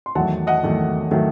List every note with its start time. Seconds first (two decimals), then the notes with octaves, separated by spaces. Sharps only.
0.06 C6
0.15 E2 D#3 F#3 A3 F#5 A5
0.47 D#5 F#5
0.63 E2 D#3 F#3 A3
1.11 D#3 F#3 A3